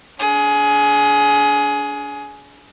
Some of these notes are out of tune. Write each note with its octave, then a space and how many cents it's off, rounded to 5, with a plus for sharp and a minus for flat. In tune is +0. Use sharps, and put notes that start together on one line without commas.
D4 -30 G#4 +20